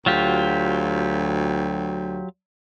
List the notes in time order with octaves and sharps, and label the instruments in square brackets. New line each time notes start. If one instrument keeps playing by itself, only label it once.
[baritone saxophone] D2 [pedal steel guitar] F#3 F4 G4